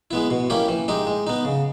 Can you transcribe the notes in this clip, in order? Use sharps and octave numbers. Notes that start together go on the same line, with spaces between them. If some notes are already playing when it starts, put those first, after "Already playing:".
G#3 B3 E4
B2
A#3 C#4 E4 G4
E3
G#3 D#4 G4
G#3
B3 D#4
C#3